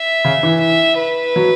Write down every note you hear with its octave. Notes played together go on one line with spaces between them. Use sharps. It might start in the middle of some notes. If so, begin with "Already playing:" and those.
Already playing: E5
C#3
E3
E5
B4
F#3